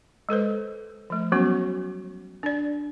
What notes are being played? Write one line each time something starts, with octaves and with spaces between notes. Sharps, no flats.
G#3 A4 B4 C5
F3 A3
F#3 G3 B3 C#4 F#4
D4 D5